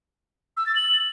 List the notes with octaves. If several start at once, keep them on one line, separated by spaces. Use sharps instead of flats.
E6
A6
F#7